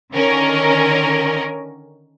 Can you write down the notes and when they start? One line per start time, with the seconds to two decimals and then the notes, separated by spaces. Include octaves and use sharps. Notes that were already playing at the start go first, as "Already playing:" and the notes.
0.12 D3 D#3 C#4 A#4